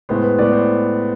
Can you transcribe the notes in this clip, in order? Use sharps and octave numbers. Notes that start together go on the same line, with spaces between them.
A2 G#3 B3 C5
B4
A2 G#3 B3 D5
C5